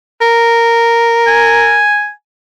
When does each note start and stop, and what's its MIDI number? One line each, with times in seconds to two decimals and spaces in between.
0.21 1.83 70
1.27 2.11 80